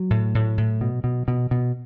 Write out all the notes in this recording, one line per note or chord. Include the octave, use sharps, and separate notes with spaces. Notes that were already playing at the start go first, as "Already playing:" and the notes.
Already playing: F#3
A2
A2
A2
B2
B2
B2
B2